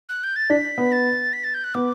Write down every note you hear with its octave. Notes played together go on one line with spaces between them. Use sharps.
F#6
G6
A6
D4 B6
B3
A6
B6
A6
G6
F#6
B3 D6